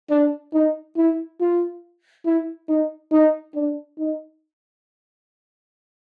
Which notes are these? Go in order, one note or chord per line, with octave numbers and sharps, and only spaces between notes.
D4
D#4
E4
F4
E4
D#4
D#4
D4
D#4